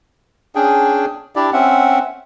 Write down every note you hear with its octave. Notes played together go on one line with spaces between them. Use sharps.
C#4 D4 G#4 G5
D4 E4 G4 D5
C4 C#4 E5 F#5